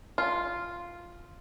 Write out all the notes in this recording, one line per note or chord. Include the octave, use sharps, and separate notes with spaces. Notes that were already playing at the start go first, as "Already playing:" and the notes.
F4